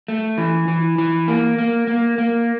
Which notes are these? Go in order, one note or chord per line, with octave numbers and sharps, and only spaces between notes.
A3
E3
E3
E3
A#3
A#3
A#3
A#3